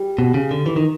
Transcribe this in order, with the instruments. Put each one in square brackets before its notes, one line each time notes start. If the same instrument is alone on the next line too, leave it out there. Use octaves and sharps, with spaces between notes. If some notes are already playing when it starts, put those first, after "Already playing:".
Already playing: [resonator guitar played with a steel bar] G3 G4
[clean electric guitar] B2
C#3
D3
E3
D#3